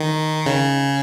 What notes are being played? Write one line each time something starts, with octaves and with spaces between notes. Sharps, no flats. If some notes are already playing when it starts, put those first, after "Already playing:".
Already playing: D#3
C#3